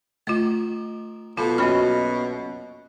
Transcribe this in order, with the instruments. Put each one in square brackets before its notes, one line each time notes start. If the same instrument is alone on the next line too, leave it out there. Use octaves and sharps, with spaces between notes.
[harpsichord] D#3 [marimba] A3 F4
[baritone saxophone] B2 [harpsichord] F3 [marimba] F4 [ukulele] A4
[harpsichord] B1 F#2 [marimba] A#3 B5 F6 [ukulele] C#4 D#5